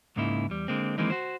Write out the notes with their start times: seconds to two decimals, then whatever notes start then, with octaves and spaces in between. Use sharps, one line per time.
0.16 C#2 G#2 C#3 A#3 D#4 E4
0.49 E2 G3
0.68 D3 G#3 A#3 C4
0.98 D#3 E3 G#3 A#3 C4 D#4
1.10 F#4 C5